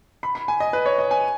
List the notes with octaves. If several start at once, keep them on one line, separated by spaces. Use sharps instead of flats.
B5
B5
G#5
D#5
B4
C#5
D#5
G#5